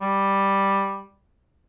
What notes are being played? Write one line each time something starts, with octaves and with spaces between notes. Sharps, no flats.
G3